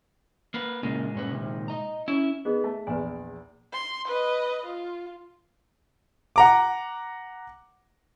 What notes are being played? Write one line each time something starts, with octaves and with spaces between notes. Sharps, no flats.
A#3 B4
A#2 C#3 G#3 A#3
G2 C#4 B4
C3 D#3
D#5 A#5
C#4 E4
B3 D#4 G#4 D#5
A3
A#1 E2 B4 D5 G#5
C6
B4 D#5
F4
F#5 A#5 D6